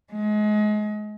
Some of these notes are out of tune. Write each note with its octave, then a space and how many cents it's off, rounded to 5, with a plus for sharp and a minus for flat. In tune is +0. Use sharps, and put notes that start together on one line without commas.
G#3 +30